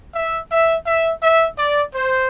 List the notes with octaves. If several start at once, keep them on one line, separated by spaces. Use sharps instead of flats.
E5
E5
E5
E5
D5
C5